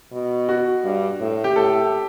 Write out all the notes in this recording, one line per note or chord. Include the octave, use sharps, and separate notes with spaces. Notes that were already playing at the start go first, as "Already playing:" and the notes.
B2
F#4
G2
A2
G4
A2 A4